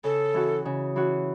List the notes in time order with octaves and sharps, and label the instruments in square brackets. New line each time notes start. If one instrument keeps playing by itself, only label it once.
[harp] C#3 [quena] A4
[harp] E3 C#4 F#4
C#3
E3 C#4 F#4